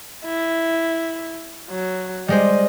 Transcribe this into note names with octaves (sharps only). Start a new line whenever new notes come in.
E4
F#3
G3 G#3 C5 D#5